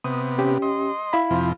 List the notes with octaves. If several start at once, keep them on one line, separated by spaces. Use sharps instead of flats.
C3 B3 D#6
C#4 G4
D#5 C6
E4 F5 B5
F2 C3 F3